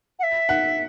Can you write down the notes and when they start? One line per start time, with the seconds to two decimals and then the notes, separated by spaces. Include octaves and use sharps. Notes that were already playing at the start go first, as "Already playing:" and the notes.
0.19 F#5
0.23 E5
0.49 F#5